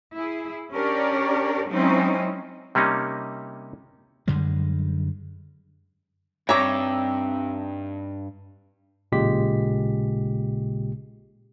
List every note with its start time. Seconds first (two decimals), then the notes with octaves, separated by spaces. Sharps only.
0.15 E4 G#4
0.72 C#4 D4 G4 A#4 C#5 D5
1.68 F#3 G#3 C4 C#4 D#4 E4
2.75 C3 G3 A#3 C#4 D#4
4.28 F#2 D3 G3 G#3
6.49 G2 C4 D#4 C#5 E5 A#5 D6
9.12 A1 A#2 C#3 G#3 G4 B6